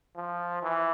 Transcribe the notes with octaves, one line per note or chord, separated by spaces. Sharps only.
F3
E3